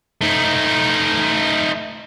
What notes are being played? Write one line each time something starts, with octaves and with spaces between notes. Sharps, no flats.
A3 D#4